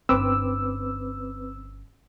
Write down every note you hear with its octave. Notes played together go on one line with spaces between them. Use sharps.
G1 C4 C#4 B4 D6 E6